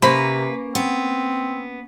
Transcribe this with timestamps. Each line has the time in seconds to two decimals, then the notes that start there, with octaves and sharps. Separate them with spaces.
0.02 C3 A#3 C#4 B4 C5 B5
0.75 B3 C4